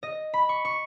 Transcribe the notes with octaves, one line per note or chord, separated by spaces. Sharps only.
D#5
B5
C#6
C#6